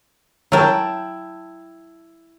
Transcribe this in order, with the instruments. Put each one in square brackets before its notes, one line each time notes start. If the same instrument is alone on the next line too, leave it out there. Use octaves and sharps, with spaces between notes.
[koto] F#3 A#4 [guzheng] E4 G5 A5